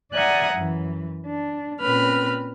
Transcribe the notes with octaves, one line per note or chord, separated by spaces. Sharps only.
D5 E5 F#5 G#5 A#5 D#6
F#2 E3
D4
A#2 C4 C#4 B4 B5 F6